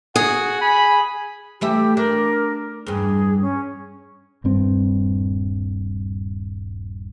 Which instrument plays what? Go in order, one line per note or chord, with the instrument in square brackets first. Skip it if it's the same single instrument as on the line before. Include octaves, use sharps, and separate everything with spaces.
[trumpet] F#4 [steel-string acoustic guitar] G#4 [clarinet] F#5
[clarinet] G#5 [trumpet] B5
[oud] E3 A3 E5 [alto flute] G4
[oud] D4 [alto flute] A#4
[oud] E2 G2 [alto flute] G#4
[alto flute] C#4
[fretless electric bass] D#1 G2 C4